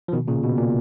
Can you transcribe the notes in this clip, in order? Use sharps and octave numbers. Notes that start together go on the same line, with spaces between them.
F3
B2 D#3
A#2 C#3
B2
A#2